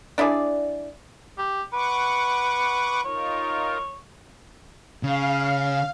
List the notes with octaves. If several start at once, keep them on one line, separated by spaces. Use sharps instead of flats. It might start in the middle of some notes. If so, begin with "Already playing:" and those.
D4 E4 G#4 D5
G4
B4 F#5 C#6 D6
D#4 F4 A#4 C#5
C#3 F5